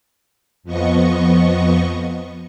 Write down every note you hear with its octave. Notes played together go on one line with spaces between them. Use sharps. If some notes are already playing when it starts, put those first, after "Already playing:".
F2 F3 B3 D#5 C#6